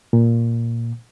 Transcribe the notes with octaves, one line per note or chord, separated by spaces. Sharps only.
A#2